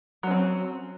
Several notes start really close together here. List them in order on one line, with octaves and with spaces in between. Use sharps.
F#3 C#4 C4